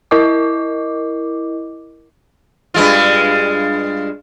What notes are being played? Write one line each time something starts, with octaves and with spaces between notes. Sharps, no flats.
E4 A#4 D#5 D6
G2 G#3 F4